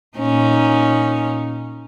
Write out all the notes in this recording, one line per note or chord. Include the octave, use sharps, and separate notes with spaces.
A#2 C#4 D#4